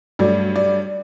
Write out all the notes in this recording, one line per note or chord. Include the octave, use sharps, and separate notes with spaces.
G2 F#3 A3 D5
D5